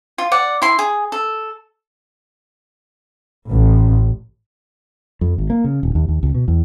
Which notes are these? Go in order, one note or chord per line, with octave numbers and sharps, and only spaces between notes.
F4
D5 F#5
E4 C6
G#4
A4
A1
F2
G#1
A#3
C#3
D#1
D#2
D#2
C#2
B2
E2